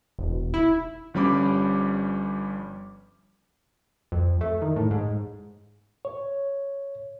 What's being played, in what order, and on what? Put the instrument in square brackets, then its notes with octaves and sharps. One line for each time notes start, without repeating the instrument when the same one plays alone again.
[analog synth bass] E1
E4
[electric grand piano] G1 F3 G3 C#4 B5 D6
[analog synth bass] F2
A3
D#3
A2
G#2
[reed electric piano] C#5